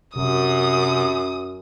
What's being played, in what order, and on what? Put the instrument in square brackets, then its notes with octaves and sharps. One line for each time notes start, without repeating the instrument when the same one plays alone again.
[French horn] F#2 [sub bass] C3 [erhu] D#6